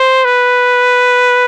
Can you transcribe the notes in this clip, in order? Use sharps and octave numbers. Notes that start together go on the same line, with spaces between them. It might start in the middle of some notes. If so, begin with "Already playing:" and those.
Already playing: C5
B4